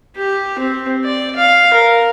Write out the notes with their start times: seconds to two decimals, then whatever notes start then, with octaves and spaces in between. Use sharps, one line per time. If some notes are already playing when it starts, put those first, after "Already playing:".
0.16 G4
0.59 C4
1.04 D5
1.36 F5
1.73 A#4